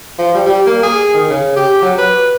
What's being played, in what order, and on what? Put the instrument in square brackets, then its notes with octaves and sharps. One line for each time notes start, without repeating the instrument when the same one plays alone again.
[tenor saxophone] F3
G3
G3
A#3
G#4
D#3
C#3
G4
F#3
B4